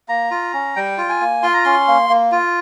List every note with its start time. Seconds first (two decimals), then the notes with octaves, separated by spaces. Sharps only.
0.09 A#3 A#5
0.31 F4
0.53 C#4
0.76 G3 G5
0.98 F4
1.09 G#5
1.20 A#3
1.43 F4 C6
1.54 A#5
1.64 C#4 C6
1.88 A#3
2.10 A#3
2.32 F4